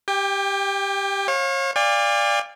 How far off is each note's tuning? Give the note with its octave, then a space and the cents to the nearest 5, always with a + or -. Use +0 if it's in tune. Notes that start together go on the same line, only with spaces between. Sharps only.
G4 +5 G5 +35
C#5 -35 F5 +20
D5 +0 F5 +0 G#5 -45